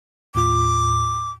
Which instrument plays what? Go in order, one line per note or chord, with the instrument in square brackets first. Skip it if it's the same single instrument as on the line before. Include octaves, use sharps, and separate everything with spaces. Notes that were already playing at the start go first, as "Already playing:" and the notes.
[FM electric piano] D#2 A2 F4 [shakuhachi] D6